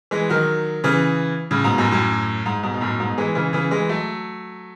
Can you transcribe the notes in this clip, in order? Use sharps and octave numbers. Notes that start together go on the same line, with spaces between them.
E3 G#3
D#3 F#3
C#3 E3
A2 C#3
G#2 B2
F#2 A2
F#2 A2
G#2
G#2 B2
B2
F#2 A2
G#2 B2
E3 G#3
C#3 E3
C#3 E3
E3 G#3
F#3 A3